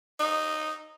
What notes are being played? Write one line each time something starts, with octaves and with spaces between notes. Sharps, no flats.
D#4